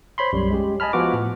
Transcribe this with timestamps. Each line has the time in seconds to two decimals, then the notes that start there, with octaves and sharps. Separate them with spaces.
0.18 C5 C#5 B5 C6
0.33 B1 F#2 G3
0.50 G#3 C#4 G4
0.80 D#5 G#5 A5 B5 F6
0.93 F3 B3 F4 F#4 B4 D6
1.13 A2